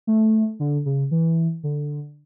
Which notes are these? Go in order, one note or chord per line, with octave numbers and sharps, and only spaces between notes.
A3
D3
C#3
E3
D3